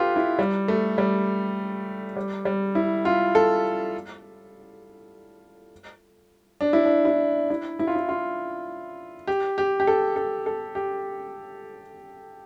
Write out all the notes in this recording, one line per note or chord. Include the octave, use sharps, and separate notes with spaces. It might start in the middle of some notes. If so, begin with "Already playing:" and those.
Already playing: F4 G4 A4 B4
E4
G3
A3
G3
G3
G3
E4
F4
A4
D4
E4
D4
E4
E4
E4
F4
E4
F4
G4
G4
G4
A4
A4
A4
G4